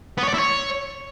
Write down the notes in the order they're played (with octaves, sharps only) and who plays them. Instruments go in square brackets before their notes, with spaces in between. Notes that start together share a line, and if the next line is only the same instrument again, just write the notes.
[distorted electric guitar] B3
C#5
D5
E4
C#5